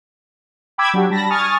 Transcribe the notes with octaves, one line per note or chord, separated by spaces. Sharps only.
G5 B5 D6 E6 G#6
F#3 D4 F#4 G4
G3 A5 B5 A#6
G#5 C#6 D#6 F6 A6